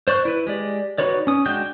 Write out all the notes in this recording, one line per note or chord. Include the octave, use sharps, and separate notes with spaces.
C5 D5 C#6 F#6
E4 B4
G#3 G4 D5
D#4 F#4 B4 C#5 D5
C#4 D#6
G#3 D4 F#4 G5 G6